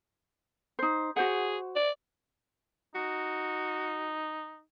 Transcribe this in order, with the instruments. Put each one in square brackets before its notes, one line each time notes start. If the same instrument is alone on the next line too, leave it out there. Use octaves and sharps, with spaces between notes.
[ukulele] D#4 C5
[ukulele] F#4 C5 F#5 [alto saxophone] G#4
[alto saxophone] D5
[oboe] D#4 [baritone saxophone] F#4